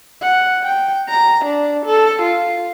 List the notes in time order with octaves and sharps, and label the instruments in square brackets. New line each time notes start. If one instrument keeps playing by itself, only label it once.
[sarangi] F#5
G5
A#5
D4
A4
F4